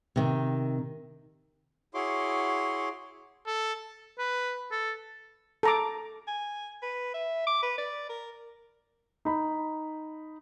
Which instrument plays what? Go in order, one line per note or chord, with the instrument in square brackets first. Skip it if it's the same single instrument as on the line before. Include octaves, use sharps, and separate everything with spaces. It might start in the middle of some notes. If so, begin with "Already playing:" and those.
[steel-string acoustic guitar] C3 D#3
[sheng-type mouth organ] E4 F#4 G#4 C#5 C6 D6
[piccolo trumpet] A4
[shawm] B4
A4
[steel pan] A4 A#5 D6
[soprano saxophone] G#5
B4
E5
D6
B4
D5
A#4
[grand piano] D#4 B5